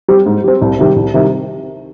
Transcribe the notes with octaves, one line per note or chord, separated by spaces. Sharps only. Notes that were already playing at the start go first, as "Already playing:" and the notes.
G3 C4
G#2
G3 C4
C2
C3 D#3 G3
C2
C3 D#3 G3